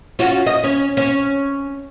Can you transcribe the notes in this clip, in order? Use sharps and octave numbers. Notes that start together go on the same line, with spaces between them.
C#4 F4 F#4
D#5
C#4
C#4